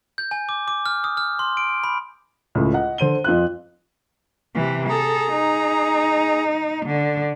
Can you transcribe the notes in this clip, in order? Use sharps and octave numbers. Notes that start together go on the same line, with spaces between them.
G6
G#5
D6
D6
F6
D#6
F6
C6
D7
B5
C#2 A2
D#5 F#5
D3 C5 D#7 G7
F2 F4 F#6
C3 E3
G#4 A4 A#5
D#4
D3